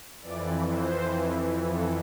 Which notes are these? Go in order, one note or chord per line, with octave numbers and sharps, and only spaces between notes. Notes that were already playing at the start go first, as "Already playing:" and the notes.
F2 E3 D5
C5
A4